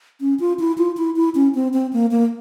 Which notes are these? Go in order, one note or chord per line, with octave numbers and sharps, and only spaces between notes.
C#4
F4
E4
F4
E4
E4
C#4
C4
C4
A#3
A#3